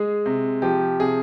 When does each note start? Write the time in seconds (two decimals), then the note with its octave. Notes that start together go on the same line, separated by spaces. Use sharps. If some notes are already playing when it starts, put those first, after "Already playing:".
Already playing: G#3 G#4
0.26 C3
0.62 F3 G4
1.00 C3 G#4